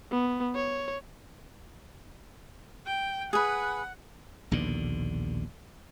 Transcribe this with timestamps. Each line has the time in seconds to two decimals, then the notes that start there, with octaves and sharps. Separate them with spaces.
0.11 B3
0.55 C#5
2.86 G5
3.33 G#4 B4 F#5
4.51 A#1 D#2 B2 D3